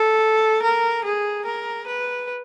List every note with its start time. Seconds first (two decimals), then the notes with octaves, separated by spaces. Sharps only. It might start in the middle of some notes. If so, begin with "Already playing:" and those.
Already playing: A4
0.63 A#4
1.04 G#4
1.46 A#4
1.87 B4